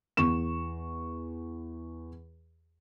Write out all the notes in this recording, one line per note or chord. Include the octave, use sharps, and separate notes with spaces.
E2 C#6 E7